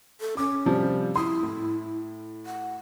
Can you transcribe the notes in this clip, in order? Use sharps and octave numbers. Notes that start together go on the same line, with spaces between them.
A4
C#4 D6
C3 F3 G3
E4 C6 D#6
A2
F#5